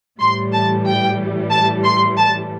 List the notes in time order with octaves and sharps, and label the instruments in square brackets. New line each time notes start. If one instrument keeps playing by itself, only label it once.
[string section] A2 E3 G3 C6
A5
G5
A5
C6
A5